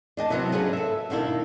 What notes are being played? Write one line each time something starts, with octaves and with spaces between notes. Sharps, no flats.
D4 D#5 G5 A5
C3 F#3 B3 E4
C#3 F#3 C#4 D4 G#4 B4
A4 E5
B2 D#3 A#3 D4 E4